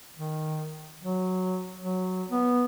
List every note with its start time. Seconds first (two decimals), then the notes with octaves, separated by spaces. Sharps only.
0.17 D#3
1.03 F#3
1.81 F#3
2.31 B3